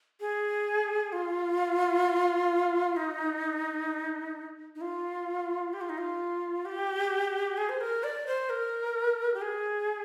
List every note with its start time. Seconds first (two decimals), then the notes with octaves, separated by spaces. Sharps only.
0.20 G#4
1.12 F4
2.97 D#4
4.75 D#4
4.81 F4
5.73 G4
5.81 F4
5.89 D#4
5.98 F4
6.65 G4
7.57 G#4
7.69 C5
7.81 A#4
8.04 D5
8.27 C5
8.50 A#4
9.34 G4
9.42 G#4